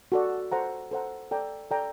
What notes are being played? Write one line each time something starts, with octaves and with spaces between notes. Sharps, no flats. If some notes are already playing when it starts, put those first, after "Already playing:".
F#4 A4 D5
A4 C5 F#5 A#5
A4 C5 F#5 A#5
A4 D5 G5 A#5
A4 D5 G5 A#5